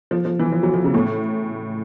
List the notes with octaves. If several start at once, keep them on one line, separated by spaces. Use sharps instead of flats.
F3
F3
E3
F3
F#3
F3
C#3
A2